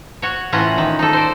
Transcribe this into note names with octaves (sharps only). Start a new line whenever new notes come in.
F#4 C#5
A2 E3 C#4 F4 F#5 A#5
D#3
D#4 A4
C5 D5